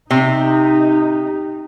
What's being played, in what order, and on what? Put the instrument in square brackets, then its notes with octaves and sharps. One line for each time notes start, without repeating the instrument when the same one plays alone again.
[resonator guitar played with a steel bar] C3 [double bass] D#4